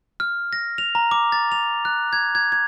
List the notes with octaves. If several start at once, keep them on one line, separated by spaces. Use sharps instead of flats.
F6
A#6
F7
A#5
D6
A6
F7
F#6
G#6
G#6
G#6